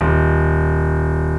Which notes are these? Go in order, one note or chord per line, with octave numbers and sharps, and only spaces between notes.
D#1